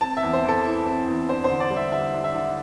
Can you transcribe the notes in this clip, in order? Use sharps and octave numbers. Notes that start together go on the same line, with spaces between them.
C4 A5
E5
E2
C5
E3 A4
E4
C4
E2
D4 C5
C5
D3
D5
G3
E5
D3 E5
D4
E5
D3